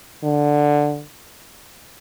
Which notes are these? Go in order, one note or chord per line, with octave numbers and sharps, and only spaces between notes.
D3